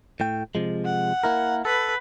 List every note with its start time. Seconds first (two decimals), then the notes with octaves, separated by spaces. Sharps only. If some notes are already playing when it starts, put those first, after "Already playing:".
0.20 A2 A3 G5
0.55 C3 F3 G#3
0.85 F#5
1.24 A#3 E4 A#4
1.65 A4 B4